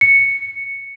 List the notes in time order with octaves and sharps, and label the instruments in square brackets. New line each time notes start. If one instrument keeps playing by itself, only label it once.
[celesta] C#7